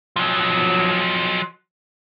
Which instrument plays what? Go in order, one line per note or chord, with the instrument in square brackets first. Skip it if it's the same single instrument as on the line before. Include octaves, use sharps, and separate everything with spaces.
[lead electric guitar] F3 F#3